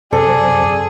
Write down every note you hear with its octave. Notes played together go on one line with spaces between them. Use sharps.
F#2 C3 G#4 A4 C5 D5